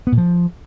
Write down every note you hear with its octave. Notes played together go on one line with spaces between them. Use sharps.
B3
A#2
F3